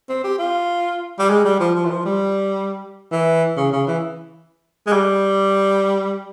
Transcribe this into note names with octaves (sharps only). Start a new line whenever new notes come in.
C4
G4
F4
G3
G#3
G3
F3
F3
E3
F3
G3
E3
C#3
C#3
E3
G#3
G3